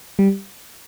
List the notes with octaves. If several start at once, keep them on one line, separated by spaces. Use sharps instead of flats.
G3